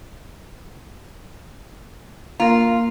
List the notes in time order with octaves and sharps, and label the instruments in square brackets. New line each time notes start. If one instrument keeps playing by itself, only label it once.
[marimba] A#3 A#4 [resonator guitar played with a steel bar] F4